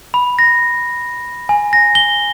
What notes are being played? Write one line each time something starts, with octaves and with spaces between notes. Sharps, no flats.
B5
A#6
G#5
A#6
G7